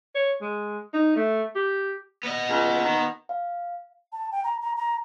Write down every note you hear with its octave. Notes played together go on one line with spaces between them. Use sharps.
C#5
G#3
D#4
A3
G4
B3 D#5
C#2
D#3
F5
A5
G5
A#5
A#5
A#5